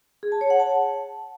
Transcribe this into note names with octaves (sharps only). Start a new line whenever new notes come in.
G#4
A5
C#5
F#5
A5